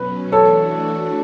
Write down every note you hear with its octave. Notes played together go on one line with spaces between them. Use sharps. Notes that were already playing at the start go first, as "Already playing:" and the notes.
Already playing: B2 F#3 C#4 B4
E3 A3 D4 F#4 A4 C#5